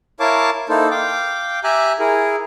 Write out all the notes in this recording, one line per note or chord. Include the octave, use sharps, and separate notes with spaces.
E4 A#4 C#5 F5 A5 D6
A#3 D#4 E4 A4 C5
F5 G5 D6
G4 E5 G#5 A#5 F#6
E4 G#4 A#4